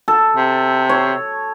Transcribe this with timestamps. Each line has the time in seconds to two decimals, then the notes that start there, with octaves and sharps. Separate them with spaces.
0.08 A4
0.37 C3
0.89 C#5